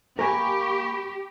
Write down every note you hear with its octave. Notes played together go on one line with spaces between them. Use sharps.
A#3 G4 A#4 G#5 B5 C#6